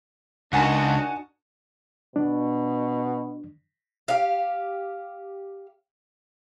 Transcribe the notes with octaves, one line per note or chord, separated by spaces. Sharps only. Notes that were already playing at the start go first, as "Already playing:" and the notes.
C#2 D4 D#4 F#4 A#4 F#5 G#5 A5
B2 D4
G4 F5